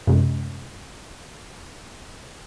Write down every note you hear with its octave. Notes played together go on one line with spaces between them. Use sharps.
F#2 C3 G#3